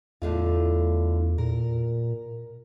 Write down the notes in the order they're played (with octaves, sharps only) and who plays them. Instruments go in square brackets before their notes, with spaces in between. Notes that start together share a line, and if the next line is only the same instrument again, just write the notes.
[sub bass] E2 [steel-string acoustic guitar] A2 D3 F4
[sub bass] A#2 [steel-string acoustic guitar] A#4